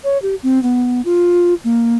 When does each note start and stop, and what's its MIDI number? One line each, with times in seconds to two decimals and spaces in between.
0.04 0.18 73
0.22 0.35 67
0.43 0.62 60
0.63 1.01 59
1.05 1.54 65
1.64 1.98 58